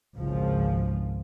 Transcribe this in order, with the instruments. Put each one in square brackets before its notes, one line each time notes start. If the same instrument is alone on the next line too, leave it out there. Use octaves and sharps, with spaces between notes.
[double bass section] G#1 C#2 F3